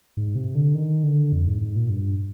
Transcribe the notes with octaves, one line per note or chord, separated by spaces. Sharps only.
G#2
C3
D3
D#3
D3
F2
G#2
G#2
A#2
G2